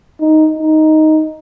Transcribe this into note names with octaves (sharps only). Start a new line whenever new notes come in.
D#4
D#4